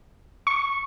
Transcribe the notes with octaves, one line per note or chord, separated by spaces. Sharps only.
C#6